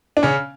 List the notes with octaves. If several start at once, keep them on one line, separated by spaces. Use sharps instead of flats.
D4
C#3 C#4